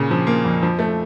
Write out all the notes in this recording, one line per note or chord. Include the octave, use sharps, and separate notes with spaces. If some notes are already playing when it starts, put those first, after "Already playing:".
Already playing: A#2 C#3
F3
A#3
F2
F3
A3